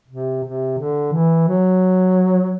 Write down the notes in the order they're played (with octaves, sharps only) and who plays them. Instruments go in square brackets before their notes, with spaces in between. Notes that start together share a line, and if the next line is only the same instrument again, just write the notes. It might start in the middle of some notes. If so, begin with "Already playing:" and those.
[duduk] C3
C3
D3
E3
F#3